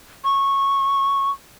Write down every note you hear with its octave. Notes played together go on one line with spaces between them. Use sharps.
C#6